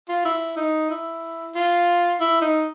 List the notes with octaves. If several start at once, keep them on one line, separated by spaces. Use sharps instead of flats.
F4
E4
D#4
E4
F4
E4
D#4